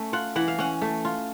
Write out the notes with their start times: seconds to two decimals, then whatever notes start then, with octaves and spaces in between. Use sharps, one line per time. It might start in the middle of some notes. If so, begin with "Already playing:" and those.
Already playing: A3 C#4
0.13 F4 F#5
0.36 E3 F#5
0.48 F5
0.59 C#4 F#5
0.82 A3
1.05 F4